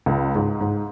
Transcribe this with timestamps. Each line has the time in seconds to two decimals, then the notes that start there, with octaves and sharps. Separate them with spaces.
0.06 C#2
0.36 G#2
0.61 G#2